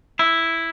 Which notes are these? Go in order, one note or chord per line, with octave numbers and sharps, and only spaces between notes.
E4